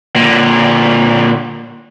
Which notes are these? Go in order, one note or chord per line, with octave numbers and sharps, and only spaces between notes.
A#2 D3